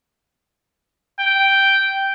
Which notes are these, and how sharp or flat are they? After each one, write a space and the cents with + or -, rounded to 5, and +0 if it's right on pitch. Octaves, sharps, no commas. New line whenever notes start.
G5 -5